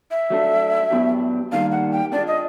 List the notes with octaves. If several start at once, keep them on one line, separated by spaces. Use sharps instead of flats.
E5
F#3 A3 D4
A2 F#3 B3 D4 G4
D#3 G3 A#3 D4 F5
F#5
G5
A#3 D4 F4 G#4 D5
D#5